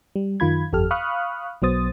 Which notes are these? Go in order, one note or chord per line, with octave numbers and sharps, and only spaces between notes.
G3
F#2 D#3 F4 B5 G#6
G1 F2 G4 A4 F6
F5 B5 C#6 D#6 F6 F#6
B1 F#3 B3 C5 D#6 A6